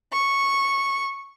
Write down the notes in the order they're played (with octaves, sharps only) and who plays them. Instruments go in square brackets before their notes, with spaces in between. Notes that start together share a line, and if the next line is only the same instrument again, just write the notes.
[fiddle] C#6